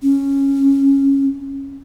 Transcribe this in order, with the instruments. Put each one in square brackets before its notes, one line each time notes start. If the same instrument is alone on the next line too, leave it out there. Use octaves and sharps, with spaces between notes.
[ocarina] C#4